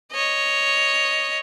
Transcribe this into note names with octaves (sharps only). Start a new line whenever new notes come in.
C#5 D#5